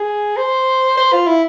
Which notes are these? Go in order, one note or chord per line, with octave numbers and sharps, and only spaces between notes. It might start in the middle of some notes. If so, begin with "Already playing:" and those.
Already playing: G#4
C5
C5
F4
E4